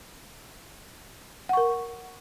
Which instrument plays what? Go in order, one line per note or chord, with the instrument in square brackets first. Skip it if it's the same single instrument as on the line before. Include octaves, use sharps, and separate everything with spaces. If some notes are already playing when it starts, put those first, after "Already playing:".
[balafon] F#5
C#6
A#4